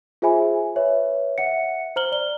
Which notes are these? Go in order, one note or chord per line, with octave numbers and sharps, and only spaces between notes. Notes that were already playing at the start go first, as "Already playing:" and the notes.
F4 G#4 C5 E5 G#5 B5
B4 C#5 E5
E5 F#5 C#7
C5 A#5 F6 F#7 G7
D5 G7